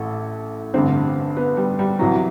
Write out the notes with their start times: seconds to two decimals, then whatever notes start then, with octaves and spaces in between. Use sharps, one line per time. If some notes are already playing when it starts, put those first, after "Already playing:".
Already playing: A1 A2 A4
0.74 A1 G2 D3 C4
1.37 B3
1.57 G3
1.79 G3
1.99 C2 C3 E3 F#3